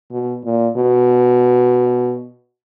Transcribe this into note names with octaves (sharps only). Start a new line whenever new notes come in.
B2
A#2
B2